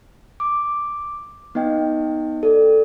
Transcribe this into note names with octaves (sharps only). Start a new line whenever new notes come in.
D6
B3 D#4 D#5 G5
A4 D5